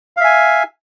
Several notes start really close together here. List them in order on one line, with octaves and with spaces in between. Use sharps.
F5 E5 G#5